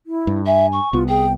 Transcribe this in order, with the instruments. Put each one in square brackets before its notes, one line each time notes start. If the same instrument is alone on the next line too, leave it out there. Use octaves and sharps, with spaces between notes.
[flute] E4
[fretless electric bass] G2
[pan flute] E5 [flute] G#5
[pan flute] C#6
[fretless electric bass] C2 B3 [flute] F4
[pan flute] G#4 [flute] G5